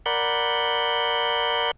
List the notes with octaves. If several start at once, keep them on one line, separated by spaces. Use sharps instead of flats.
A#4 D5 F#5 B5 G6